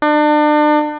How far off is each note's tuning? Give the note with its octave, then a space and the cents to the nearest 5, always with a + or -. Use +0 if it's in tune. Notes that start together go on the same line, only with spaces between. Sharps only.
D4 +35